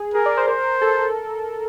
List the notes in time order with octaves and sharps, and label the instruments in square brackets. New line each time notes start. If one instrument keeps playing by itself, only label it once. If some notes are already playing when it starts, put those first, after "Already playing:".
Already playing: [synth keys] G#4
[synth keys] G#4 [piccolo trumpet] A#4
[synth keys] D5
C5
[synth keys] A#4 [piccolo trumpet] C5
[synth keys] A4